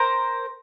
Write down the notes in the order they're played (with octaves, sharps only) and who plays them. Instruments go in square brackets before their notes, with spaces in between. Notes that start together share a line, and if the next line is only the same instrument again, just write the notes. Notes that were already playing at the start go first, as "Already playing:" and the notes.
Already playing: [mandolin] A#4 C5